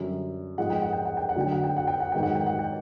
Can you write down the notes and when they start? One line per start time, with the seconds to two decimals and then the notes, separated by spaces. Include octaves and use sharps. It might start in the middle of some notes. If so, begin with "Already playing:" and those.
Already playing: F#2 D3 G3
0.58 G#2 F3 G#3 F#5
0.70 G5
0.82 F#5
0.93 G5
1.05 F#5
1.17 G5
1.29 F#5
1.36 D2 D3 F#3 G5
1.52 F#5
1.64 G5
1.77 F#5
1.87 G5
2.00 F#5
2.12 G#2 D#3 F#3 G5
2.23 F#5
2.35 G5
2.46 F#5
2.59 G5